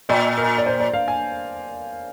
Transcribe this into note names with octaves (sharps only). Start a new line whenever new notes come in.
A#2 D5
A#4
D5
C5
D5
F5
G#5